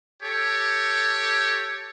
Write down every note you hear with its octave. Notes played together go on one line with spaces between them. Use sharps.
G4 A4 C#5